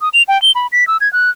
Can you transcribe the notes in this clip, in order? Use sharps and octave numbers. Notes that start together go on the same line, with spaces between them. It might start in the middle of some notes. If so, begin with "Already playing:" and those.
D#6
F7
G5
G7
B5
B6
E6
G#6
F#6